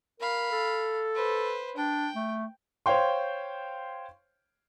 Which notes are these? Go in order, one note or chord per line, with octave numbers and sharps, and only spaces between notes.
A#4 F5 B5
A4
B4 C5
D4 G5
A3
C5 C#5 F5 G5 C6